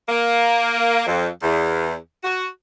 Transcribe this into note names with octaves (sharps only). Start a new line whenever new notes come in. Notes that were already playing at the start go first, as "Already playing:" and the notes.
A#3
F2
E2
F#4